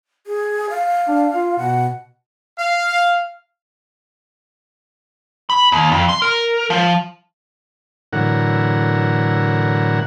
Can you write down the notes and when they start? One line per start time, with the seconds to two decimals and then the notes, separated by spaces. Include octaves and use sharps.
0.27 G#4
0.70 F5
1.08 D4
1.34 F4
1.58 B2 F#5
2.59 F5
5.50 B5
5.72 D#2
5.92 F2
6.09 C6
6.22 A#4
6.70 F3
8.13 A2 D3 E3 F#3 A#4 F#5